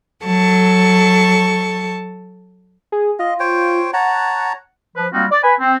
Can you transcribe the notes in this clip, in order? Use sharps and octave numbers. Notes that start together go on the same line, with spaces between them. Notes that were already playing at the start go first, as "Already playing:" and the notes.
F#3 A4 A5 C#6
G#4
F4 D#5
C5 C#5 G5
C#5 F#5 A5 A#5
F3 B4
G3 A#3 C4 D#4 F4 F#4
D5
B4 G#5 B5
C4